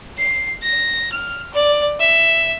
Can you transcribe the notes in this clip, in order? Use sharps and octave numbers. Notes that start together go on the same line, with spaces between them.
C7
A#6
F6
D5
E5